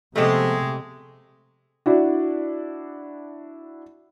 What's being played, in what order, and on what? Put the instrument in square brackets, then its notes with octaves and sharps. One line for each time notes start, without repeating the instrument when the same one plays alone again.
[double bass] C3 [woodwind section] F3 B3 A4 [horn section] G#3 [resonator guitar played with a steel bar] A3 G4
[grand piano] D4 E4 F#4